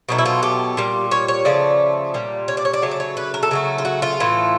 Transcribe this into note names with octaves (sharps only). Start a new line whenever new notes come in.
B2 F#3 A3 D#4
E4
F4
G4
A#2 G3
C#5
C#5
C#3 F3 A3 D5
A#2 G3
C#5
D5
C#5
D5
C#3 F#3 A3 C#5
D5
C#5
B4
A#4
A4
C#3 F#3 A3 A#4
F4
F#4
F4
A2 E3 A3